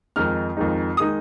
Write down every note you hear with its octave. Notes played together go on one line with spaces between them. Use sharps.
F2 D#3 G#3 D#4 F6
F2 D#3 G#3 D#4
D#3 G#3 D#4 D#6